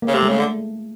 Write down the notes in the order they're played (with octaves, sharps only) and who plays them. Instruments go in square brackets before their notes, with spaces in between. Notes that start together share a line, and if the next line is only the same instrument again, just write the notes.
[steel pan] A#3
[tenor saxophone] C#3
[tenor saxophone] C3 [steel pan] A3
[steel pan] G#3
[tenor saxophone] C#3 [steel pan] A3
[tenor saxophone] D3